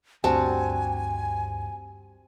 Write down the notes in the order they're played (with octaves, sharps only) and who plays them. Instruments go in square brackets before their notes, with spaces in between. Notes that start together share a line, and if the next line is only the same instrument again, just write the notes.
[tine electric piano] D2 G2 [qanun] G3 C4 F#4 [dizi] G#5 [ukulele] A5